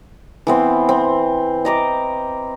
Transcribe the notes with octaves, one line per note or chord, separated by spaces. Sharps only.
E3 B3 C4
C4
D#5 A#5 D6